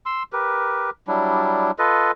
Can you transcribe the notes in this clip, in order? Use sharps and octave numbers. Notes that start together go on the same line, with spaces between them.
C6 E6
G4 A#4 B4
F#3 G3 D4 E4
F4 A4 B4 D#5